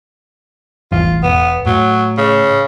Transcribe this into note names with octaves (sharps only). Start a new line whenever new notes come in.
E1 A1 E2 F4
E1 B3
A2 F#3
C#3